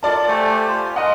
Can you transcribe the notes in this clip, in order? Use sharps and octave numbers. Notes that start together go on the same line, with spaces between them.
F4 A4 A#4 D5 A5
A3 G4 C5 G#5
F4
A#4 D#5 F#5 A#5 C6